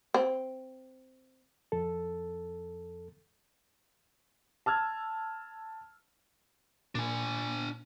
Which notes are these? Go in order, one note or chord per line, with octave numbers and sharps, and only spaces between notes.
C4
F2 A4
A5 E6 F6 G#6
A#2 D4 G#5